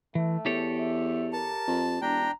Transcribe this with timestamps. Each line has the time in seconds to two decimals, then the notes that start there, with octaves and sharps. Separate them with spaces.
0.15 E3 A3
0.46 E2 G4 A4 C#5
0.79 E5
1.33 A#4 A5
1.67 F2
2.02 E1 D4 G5 A#5